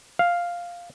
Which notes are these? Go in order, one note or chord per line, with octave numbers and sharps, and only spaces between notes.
F5